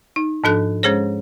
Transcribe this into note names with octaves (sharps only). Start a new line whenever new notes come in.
D#4
G#2 F3 D4 A4 F#6
G#3 C#4 G#4 C5 C#5